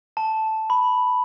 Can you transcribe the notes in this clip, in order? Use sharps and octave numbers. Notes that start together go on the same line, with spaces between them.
A5
B5